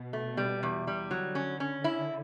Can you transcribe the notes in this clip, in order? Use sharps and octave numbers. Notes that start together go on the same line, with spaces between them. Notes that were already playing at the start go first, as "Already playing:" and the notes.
Already playing: B2
A3
G3
E2
G3
D3 F#3
C#4
C#4
E4